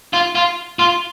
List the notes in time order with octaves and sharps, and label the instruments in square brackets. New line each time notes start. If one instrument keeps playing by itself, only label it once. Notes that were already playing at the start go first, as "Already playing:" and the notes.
[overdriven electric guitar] F4
F4
F4